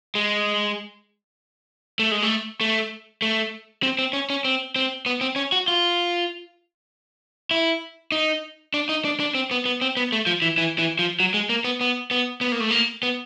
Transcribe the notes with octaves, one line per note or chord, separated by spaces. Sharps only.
G#3
A3
G#3
A3
A3
A3
C4
C4
C#4
C#4
C4
C4
B3
C4
C#4
F#4
F4
E4
D#4
D4
D#4
D4
D4
C4
B3
B3
C4
B3
A3
F3
E3
E3
E3
F3
F#3
G#3
A#3
B3
B3
B3
B3
A#3
A3
A#3
B3